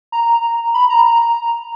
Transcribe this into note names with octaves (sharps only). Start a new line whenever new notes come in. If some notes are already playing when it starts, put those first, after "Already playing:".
A#5
B5
A#5
A#5